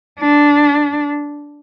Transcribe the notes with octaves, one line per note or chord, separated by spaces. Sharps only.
D4